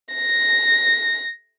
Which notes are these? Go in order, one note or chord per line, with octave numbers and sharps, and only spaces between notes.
A#6